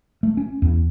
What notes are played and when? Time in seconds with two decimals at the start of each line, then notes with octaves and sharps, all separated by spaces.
0.23 A3
0.37 C#4
0.62 E2